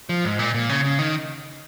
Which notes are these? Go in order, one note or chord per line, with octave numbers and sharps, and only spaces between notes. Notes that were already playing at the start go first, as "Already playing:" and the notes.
F3
G#2
A#2
A#2
C#3
C#3
D#3